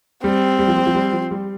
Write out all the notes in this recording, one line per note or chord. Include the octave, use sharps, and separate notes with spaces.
G3 C4
G3
F3
G3
F3
G3
F3
G3